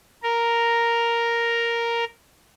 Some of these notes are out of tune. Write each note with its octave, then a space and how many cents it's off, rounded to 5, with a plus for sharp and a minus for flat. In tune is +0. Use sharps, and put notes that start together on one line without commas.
A#4 +0